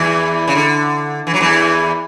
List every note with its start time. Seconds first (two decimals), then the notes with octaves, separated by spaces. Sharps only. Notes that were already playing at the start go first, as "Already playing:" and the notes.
Already playing: E2 E3
0.48 C#3
0.55 D3
1.27 E3
1.34 F#3
1.41 E2 E3